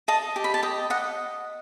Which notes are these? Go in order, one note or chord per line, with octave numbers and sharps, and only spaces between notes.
D#5 A5
G4
B5
A5
D#5 G5
D#5 F#5